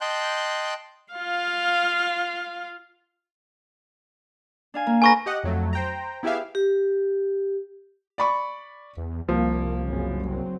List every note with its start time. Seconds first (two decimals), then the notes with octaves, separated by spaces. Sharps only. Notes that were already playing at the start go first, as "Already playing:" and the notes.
0.01 D#5 G5 A5 C6 F#6 G6
1.13 F4 F5
4.74 D4 F5 G#5
4.87 A#3
5.02 A4 B4 G#5 A#5 C#6 A#6
5.26 G4 D#5 F#5
5.44 F2 F#3 A3
5.73 C5 G5 A#5
6.23 B3 E4 G4 G#4 E5 F5
6.55 G4
8.18 D5 B5 C#6
8.97 E2
9.29 C2 F3 A#3
9.88 F#1 F#2 C#3
10.27 F#3 C4